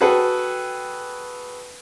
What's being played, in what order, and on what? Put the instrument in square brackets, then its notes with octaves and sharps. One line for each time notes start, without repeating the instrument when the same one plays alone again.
[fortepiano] F#4 G#4 A4 B4 G5